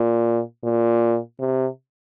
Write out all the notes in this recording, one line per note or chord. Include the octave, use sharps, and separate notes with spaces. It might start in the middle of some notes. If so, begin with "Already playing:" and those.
Already playing: A#2
A#2
C3